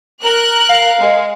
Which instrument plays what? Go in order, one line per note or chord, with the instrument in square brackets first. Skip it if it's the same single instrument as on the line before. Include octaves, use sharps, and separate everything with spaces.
[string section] A#4 F#6
[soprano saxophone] F5
[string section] G#3